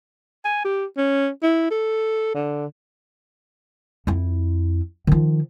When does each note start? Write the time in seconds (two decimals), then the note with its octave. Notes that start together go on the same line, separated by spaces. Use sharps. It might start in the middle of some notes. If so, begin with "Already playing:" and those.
0.45 G#5
0.65 G4
0.97 C#4
1.42 E4
1.71 A4
2.35 D3
4.07 F2 E4
5.07 D#3 F3